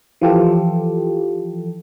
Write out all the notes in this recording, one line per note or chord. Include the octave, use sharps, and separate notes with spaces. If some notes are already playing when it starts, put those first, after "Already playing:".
E3 F3 F4 G4 A4